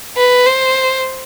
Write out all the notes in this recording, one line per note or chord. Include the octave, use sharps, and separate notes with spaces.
B4
C5